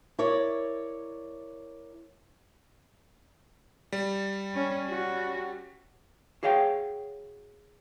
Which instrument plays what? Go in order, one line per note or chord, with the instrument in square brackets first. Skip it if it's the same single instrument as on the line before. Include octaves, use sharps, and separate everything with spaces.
[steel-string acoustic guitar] E4 A#4 C#5 D5
[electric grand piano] G3
[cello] C#4
C#4 F#4
[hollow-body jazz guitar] F#4 G#4 C#5 F5 G5